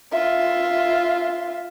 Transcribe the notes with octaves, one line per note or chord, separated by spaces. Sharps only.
F4 E5